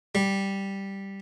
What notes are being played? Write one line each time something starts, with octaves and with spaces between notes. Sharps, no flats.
G3